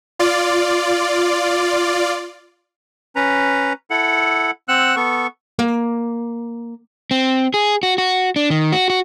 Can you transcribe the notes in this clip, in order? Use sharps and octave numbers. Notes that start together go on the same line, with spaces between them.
F4 D5
C#4 B4 A#5
E4 A4 F#5
C4 F#5 E6 F#6
B3 A4 C#6
A#3
C4
G#4
F#4
F#4
D4
D#3
F#4
F#4